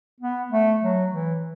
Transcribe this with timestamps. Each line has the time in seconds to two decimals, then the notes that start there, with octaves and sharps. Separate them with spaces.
0.21 B3
0.52 A3
0.83 F#3
1.12 E3